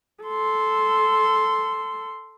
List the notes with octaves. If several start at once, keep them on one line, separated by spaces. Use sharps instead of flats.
A4 C6